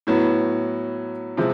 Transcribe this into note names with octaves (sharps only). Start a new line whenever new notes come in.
A2 F#3 B3
C3 F3 G#3